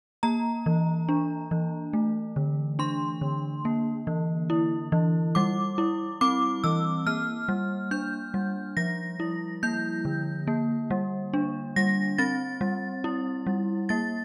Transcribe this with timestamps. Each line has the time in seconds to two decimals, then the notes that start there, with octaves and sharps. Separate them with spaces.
0.23 A#3 A#5
0.66 E3
1.09 D4
1.51 E3
1.93 A3
2.36 D3
2.79 D4 C6
3.21 D3
3.65 A#3
4.07 E3
4.50 E4
4.92 E3
5.35 G3 D6
5.78 E4
6.21 C4 D6
6.64 E3 E6
7.07 A#3 F6
7.49 G3
7.91 D4 G6
8.34 G3
8.77 F3 A#6
9.20 E4
9.63 A#3 G6
10.05 D3
10.47 A#3
10.91 G3
11.33 D4
11.76 G3 A#6
12.18 C4 A6
12.61 G3
13.04 E4
13.47 G3
13.89 A#3 A6